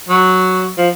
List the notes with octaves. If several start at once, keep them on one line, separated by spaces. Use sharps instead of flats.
F#3
F3